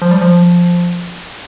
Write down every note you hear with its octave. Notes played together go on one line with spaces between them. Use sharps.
F3
G3
F3